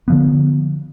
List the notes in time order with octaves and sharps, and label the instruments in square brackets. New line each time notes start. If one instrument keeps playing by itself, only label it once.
[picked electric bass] D3 F3 B3